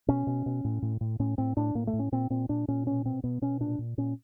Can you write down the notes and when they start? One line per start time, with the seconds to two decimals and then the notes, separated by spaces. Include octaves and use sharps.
0.08 B2 C#4
0.27 B2
0.46 B2
0.64 A2
0.82 A2
1.01 A2
1.19 A2 C#4
1.38 A2 C4
1.57 A2 D4
1.75 A2 A#3
1.87 A3
1.93 A2
1.99 C#4
2.12 A#2 C4
2.30 A#2 C4
2.49 A#2 D4
2.68 A#2 C#4
2.86 B2 C#4
3.05 B2 C4
3.24 B2 B3
3.42 B2 C#4
3.60 A#2 D4
3.79 A#2
3.98 A#2 C#4